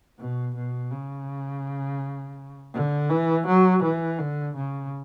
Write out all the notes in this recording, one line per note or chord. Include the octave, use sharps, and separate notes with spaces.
B2
B2
C#3
D3
E3
F#3
E3
D3
C#3